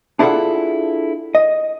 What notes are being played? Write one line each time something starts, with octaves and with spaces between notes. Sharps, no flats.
D4 E4 F4 G#4 A4 F#5
D#5